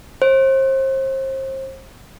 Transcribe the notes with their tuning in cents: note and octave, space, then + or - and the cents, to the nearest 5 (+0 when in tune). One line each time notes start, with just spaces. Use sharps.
C5 +35